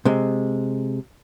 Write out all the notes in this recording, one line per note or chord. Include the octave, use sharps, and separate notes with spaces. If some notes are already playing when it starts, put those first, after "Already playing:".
C3 G#3